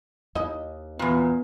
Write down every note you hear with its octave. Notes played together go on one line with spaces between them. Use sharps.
D#2 D#4 E4 D#5
E2 A#2 B3